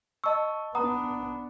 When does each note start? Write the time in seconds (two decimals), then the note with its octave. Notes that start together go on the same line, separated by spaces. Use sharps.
0.24 D#5 A5 C#6 E6
0.75 B3 D4 F#5 A#5 D#6